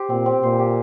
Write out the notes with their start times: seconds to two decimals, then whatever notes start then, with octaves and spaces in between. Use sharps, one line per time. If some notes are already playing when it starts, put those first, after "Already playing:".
Already playing: G4 C5
0.09 A#2 C4
0.26 C4
0.42 A#2 C5
0.59 G4